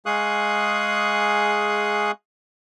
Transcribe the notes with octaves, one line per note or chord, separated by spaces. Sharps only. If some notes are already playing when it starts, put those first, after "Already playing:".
G#3 G#4 F5 C#6 D#6 F#6